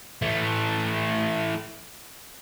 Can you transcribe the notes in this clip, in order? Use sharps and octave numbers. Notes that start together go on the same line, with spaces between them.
E3 A3